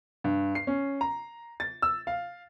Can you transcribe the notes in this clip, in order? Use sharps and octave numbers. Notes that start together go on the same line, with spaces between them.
G2
C7
C#4
A#5
A6
E6
F5